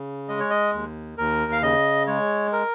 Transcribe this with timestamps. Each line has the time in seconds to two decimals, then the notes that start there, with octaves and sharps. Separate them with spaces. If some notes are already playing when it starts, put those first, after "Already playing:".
Already playing: C#3
0.29 G#3 D#5
0.40 C#5
0.50 D#5
0.74 D#2
1.18 D#2 A#4
1.52 F5
1.62 C#3 D#5
2.07 G#3 C#5
2.53 A#4